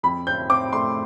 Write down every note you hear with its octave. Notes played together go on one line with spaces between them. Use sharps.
F2 B5
C4 G6
C4 D6
A3 C6